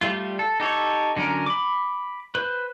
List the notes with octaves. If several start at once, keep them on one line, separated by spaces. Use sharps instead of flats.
G3 A3 F4
A4
D#4 G4 A4 C#5
D3 F#3 C#4 A#4
B5 D6
B4 C5